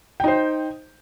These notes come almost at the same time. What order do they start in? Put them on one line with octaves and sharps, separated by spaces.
G5 D#4 C5